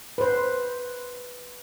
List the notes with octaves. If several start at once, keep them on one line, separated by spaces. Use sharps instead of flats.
B4 C5